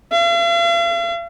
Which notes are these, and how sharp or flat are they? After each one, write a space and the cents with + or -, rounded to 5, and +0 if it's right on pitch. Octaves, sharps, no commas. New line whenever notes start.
F5 -45